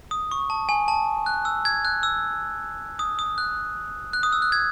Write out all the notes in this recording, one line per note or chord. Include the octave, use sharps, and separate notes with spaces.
D#6
C#6
A5
G#5
A5
F#6
E6
G#6
F#6
E6
D#6
D#6
F#6
F#6
D#6
E6
F#6
G#6